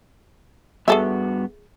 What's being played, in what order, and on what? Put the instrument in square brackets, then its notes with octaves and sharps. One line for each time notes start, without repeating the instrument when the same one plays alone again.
[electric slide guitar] G2 B3 F#4 [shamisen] G#4 A4 E5